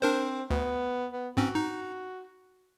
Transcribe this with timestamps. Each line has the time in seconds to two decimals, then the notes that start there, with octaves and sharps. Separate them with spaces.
0.02 C4 D4 A#4 C5
0.50 D2 B3
1.12 B3
1.37 G#2 C4 C#4 F#4
1.55 D#4